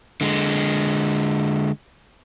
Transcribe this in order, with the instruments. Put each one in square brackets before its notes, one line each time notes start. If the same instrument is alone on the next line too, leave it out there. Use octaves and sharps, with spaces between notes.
[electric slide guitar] D3 G#3